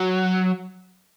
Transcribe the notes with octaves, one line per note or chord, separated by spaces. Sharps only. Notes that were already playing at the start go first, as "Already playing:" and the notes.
Already playing: F#3